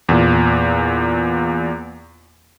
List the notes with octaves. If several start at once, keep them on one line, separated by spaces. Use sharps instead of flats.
E2 A#2